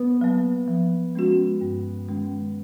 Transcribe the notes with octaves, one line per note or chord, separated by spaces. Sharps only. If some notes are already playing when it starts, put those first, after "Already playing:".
Already playing: B3
F#3 A#3
F3
G#3 C#4 F#4
G2
D#3 G#3 C#4